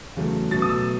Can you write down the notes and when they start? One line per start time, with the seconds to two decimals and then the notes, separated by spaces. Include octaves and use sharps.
0.16 E2 C#3 F#3 A3
0.51 B2 F#3 A3 A6
0.62 D#6
0.69 E6